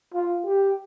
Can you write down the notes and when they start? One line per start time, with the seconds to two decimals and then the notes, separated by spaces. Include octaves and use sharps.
0.14 F4
0.45 G4